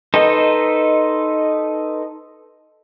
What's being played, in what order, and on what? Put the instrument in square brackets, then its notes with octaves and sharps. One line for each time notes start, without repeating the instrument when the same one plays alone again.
[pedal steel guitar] D#4 A4 B4 C5 D#5